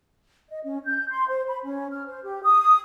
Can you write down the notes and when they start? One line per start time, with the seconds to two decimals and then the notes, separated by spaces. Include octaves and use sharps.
0.49 D#5
0.64 C#4
0.85 G6
1.09 C6
1.28 C5
1.48 B5
1.63 C#4
1.91 F6
2.07 C5
2.23 G4
2.43 D#6